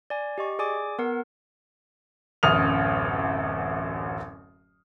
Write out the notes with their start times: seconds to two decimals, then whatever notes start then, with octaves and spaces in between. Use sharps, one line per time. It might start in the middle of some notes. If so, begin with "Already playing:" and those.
0.10 D5 G#5
0.38 G4 D#5 C#6
0.59 G#4 D5 G#5 D6
0.99 B3 A#4 F#5
2.43 D1 A1 F#2 D#6 F6 F7